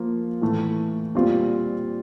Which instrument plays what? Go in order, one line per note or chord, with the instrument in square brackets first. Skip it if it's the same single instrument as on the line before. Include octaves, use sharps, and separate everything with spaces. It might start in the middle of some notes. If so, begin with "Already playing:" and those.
Already playing: [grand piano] F3 A#3 F4
A2 E3 A3
A#2 G3 C4 F4